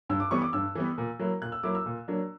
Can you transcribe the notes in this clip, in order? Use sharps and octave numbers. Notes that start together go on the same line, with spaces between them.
G2 E6
D6
E3 G3 B3 C#6
D6
G2 E6
E3 G3 B3
A#2
F#3 A#3 E4
A#2 F#6
E6
F#3 A#3 E4 D6
E6
A#2
F#3 A#3 D4